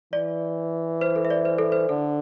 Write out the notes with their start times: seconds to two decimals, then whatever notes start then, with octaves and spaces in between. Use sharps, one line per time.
0.13 E3 D5
1.01 C5
1.16 A4
1.25 E5
1.30 D5
1.45 C5
1.58 A4
1.72 C5
1.89 D3 A4